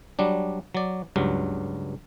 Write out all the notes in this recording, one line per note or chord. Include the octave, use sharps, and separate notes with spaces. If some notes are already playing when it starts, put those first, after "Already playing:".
F#3 G3 D4
F#3 D5
C#2 G2 F#3